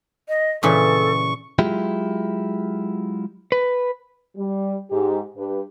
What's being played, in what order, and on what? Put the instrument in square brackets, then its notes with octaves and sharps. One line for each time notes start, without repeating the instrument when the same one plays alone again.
[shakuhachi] D#5
[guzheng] A#2 C#3 E3 [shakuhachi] A4 [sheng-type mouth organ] C#6
[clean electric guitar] F#3 G#3 E4 F4 G4
[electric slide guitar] B4
[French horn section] G3
G#2 G4
G2 G4 B4